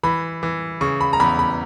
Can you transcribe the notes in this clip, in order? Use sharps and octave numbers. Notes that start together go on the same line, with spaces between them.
E3 B5
E3
C#3 C#6
B5
A#5
E2 B5
B5